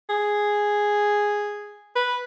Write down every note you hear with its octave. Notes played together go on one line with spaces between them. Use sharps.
G#4
B4